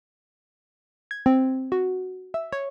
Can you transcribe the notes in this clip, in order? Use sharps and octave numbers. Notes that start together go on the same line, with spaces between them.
G#6
C4
F#4
E5
C#5